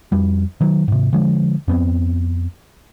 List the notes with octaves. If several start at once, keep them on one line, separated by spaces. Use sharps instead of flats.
F2 G3
D#3 F#3
G#2 C3
D3 F3 G#3
F2 B3 C4